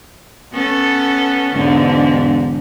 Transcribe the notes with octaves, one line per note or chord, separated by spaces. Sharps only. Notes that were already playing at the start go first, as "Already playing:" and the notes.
B3 C#4 A4
E1 G#2 D3